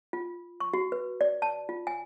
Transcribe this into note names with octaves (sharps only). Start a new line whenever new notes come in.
F4
C#6
F#4
B4
D5
A5
F4
G#5